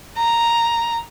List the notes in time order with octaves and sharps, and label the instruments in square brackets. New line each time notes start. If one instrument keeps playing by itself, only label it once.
[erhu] A#5